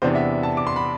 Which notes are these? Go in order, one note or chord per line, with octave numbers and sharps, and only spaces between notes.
E2 C3 E3 B3 D4 C5
E5
A5
D6
C6
B5